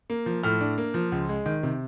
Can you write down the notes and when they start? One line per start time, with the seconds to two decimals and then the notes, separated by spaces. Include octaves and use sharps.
0.10 A#3
0.26 F3
0.43 A2 F6
0.61 D4
0.78 A#3
0.94 F3
1.12 C#2
1.29 G#3
1.46 D#3
1.63 C3